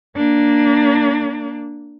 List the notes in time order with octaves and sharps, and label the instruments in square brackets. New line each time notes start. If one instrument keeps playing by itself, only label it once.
[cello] A#3 D4